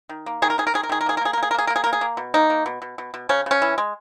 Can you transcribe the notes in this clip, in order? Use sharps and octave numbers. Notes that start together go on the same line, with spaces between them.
D#3
A#3
D#3 G#4
A#4
D#3 G#4
A#4
D#3 G#4
A#4
D#3 G#4
A#4
A#3 G#4
A#4
A#3 G#4
A#4
A#3
G#4
A#4
A#3 G#4
A#4
A#3
G#4
A#3 A#4
G#4
A#3
B2
A#3 D#4
A#3
B2
B2
B2
B2
C#3 C#4
C#3 C#4
E3
G#3